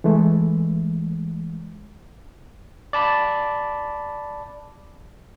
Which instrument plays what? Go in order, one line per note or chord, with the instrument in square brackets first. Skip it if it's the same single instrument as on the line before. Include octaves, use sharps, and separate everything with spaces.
[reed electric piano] E3 G#3 A3
[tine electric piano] D5 A5 B5